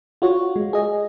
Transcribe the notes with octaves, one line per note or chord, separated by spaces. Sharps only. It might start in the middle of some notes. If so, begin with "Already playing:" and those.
F4 F#4 C#5
G#3
G#4 D#5